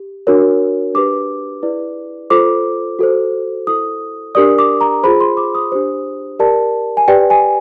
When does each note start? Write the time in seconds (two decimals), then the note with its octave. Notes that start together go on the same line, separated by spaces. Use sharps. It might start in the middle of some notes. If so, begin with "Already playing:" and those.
Already playing: G4
0.27 D4 F#4 A#4 C#5
0.94 D4 G4 B4 D6
1.62 E4 G#4 B4 D5
2.30 F4 A4 C5 D6
2.99 F#4 A4 C5
3.67 E4 A4 C5 D#6
4.35 D4 G4 A#4 D5 D#6
4.58 D6
4.81 A#5
5.03 F4 G#4 C5 B5
5.21 C6
5.37 D6
5.55 D#6
5.72 D4 G4 C5
6.39 G4 A#4 D5 A5
6.97 G#5
7.08 G4 B4 D5 G5
7.30 G#5